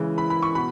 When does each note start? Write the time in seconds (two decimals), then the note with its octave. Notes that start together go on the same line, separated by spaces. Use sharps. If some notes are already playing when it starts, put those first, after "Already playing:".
Already playing: C#3 E3 G#3
0.18 B5
0.30 B5
0.43 C#6
0.55 B2 B5